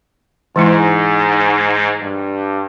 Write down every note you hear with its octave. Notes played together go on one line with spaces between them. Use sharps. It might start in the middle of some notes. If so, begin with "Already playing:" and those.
G#2 E3 G#3 E4
G2